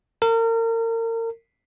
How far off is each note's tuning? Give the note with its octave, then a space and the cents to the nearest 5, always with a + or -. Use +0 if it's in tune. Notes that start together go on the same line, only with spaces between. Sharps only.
A#4 -35